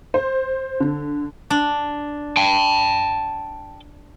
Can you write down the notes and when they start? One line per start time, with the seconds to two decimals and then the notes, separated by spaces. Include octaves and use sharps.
0.14 C5
0.80 D3
1.50 D4
2.37 G5 A5